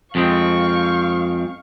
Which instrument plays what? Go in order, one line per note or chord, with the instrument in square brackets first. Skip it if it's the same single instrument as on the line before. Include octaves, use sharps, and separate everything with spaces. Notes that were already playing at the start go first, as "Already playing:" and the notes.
[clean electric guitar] F2 G#3 C4 [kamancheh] F5 C#6